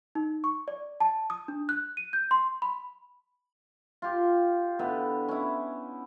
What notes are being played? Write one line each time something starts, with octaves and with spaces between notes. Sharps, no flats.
D#4
C#6
D5
A5
D#6
D4
F#6
D#7
G6
C6
B5
F4 G4
D3 B3 E4
C#4 E4